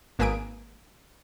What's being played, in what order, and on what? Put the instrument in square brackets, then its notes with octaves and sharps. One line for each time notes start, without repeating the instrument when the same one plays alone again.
[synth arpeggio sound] G#1 A#3 B4 G#5 D#6 D7